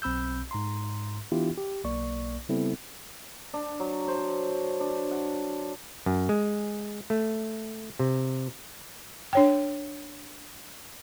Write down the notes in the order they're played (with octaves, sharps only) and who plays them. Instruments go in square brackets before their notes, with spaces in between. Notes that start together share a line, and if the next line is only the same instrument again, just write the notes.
[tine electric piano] B1 C4 B5 E6 G6
G#2 A#5 C6
E3 B3 D4 E4 F4 G4
G4
B1 A#3 D5 C#6
C#3 G3 B3 C4 E4 A4
[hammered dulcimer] D4
F#3
C5
D4
F#5
[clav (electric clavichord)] F#2
G#3
A3
C3
[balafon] D4 C#5 G5